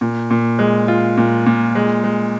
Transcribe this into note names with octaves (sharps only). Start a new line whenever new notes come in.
A#2
A#2
G#3
F4
A#2
A#2
G#3
G#3